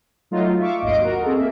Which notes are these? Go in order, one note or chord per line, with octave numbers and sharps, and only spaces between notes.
F#3 A3 D#4 F4
E5 F5 C#6 D6
G#1 D#2 D#5 C6 D7
F#4 A#4
C4 G#4 A4
A#3 E5